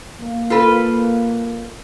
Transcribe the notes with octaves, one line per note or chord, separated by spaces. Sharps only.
A#3
F4 A4 B4